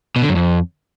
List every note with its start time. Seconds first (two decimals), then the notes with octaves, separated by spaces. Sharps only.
0.16 B2
0.22 D3
0.29 F#2
0.36 F2